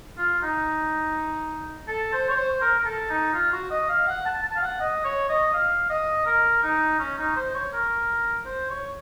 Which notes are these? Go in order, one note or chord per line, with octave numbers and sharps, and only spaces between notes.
F4
D#4
A4
C5
C#5
C5
A#4
A#4
A4
D#4
F4
F#4
D#5
F5
F#5
A5
A5
F5
F#5
D#5
C#5
D#5
F5
D#5
A#4
D#4
C#4
D#4
C5
C#5
A#4
C5
C#5